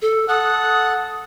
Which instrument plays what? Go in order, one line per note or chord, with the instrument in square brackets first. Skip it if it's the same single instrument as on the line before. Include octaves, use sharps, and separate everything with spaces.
[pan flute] A4
[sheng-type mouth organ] A4 F#5 F#6 [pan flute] D#6